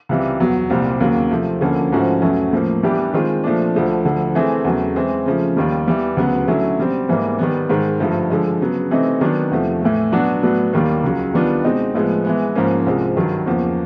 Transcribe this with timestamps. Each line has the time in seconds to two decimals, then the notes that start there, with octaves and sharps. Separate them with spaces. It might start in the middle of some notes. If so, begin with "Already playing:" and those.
0.09 C#2 C3 E3 G3
0.40 E2 B2 F#3
0.70 C2 A#2 G3 C4
1.00 D#2 C#3 F#3 A#3
1.31 C3 F3 A3 C4
1.61 D2 D3 F3 A#3 C#4
1.92 G#2 F3 A3 C#4 F#4
2.22 E2 B2 F#3 A3 C#4
2.53 A2 F3 A#3
2.83 E3 G3 B3 D4 G4
3.14 D#3 G#3 C4 F4
3.44 A#2 F3 A3 D4
3.74 D2 D3 F3 A3
4.05 D2 D3 F3
4.35 E3 A3 C4 E4 G#4
4.65 E2 C#3 F#3 A3
4.96 E3 G#3 C4
5.26 C#3 F3 A3
5.57 D#2 D#3 G3
5.87 E3 G3 B3
6.17 D2 C#3 F#3 B3
6.47 D3 F#3 A3 C#4 E4
6.78 B2 G3 C4
7.09 G#2 E3 G3 A#3
7.39 D#3 G3 B3
7.69 G#2 D#3 G#3
8.00 G2 D3 F3 A3
8.30 D3 F3 G#3
8.61 C#3 F#3 B3
8.91 C3 E3 A3 C4 D#4
9.21 D#3 F#3 B3 D4
9.51 E2 C3 F3 A3
9.81 A2 E3 A3
10.12 B2 F#3 B3 D4 F#4
10.43 A2 F#3 B3 D4 F#4
10.73 D#2 D#3 G3 A#3
11.04 C#2 C#3 F#3
11.34 D#3 G3 B3 D4 F4
11.64 B2 G#3 C4 D#4
11.95 A2 F3 G#3 B3
12.25 E3 G#3 B3
12.55 G#2 F3 A#3 C#4
12.86 C2 C3 F3 G#3
13.16 G2 D#3 F#3
13.46 E2 C#3 F3 A#3